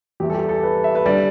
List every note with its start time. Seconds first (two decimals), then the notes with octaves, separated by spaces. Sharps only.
0.20 E2 E3 G3 G4
0.30 A4
0.34 G4
0.49 A4
0.63 B4
0.84 E5
0.95 B4
1.06 D3 G3 D5